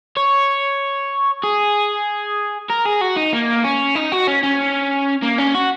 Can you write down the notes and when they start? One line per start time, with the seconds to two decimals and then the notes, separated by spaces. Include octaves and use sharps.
0.17 C#5
1.43 G#4
2.70 A#4
2.86 G#4
3.01 F#4
3.17 D#4
3.34 A#3
3.64 C#4
3.96 D#4
4.12 F#4
4.27 C#4
4.43 C#4
5.23 A#3
5.38 C#4
5.55 F#4